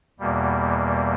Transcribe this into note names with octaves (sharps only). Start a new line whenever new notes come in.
E2 B2 G3 A#3